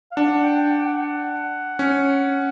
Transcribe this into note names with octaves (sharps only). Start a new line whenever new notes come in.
F5
D4 F#5
G5
F#5
G5
F#5
F#5
C#4